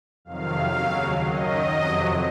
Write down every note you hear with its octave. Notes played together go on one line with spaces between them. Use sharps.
F2 C3 D#3 F#3 F5
D#2 C#3 F#3
F#2 D#3 F#3 D#5
F2 C3 F#3